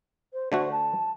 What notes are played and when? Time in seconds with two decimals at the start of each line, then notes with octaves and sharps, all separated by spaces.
0.33 C5
0.52 D3 A3 F#4 C5
0.72 A5